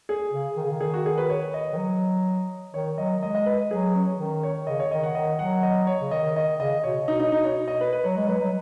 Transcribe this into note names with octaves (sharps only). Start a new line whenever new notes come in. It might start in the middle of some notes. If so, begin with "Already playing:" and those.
G#4
C#3
D#3
C#3
D#3
G#4
F#4
G#4
B4
C#5
D#5
D#3
F#3
D#3 C#5
F#3 D#5
G#3 D#5
D#5
B4
F#3 G#4
C#4
D#3
C#5
C#3 D#5
C#5
D#3 D#5
F#5
D#3 D#5
F#3 F#5
D#5
C#5
C#3
D#3 D#5
D#5
C#3 D#5
B2 C#5
B2 D#4
D#4
D#4
C#5
D#5
B4
B4
F#3 C#5
G#3
F#3 B4
G#3
F#3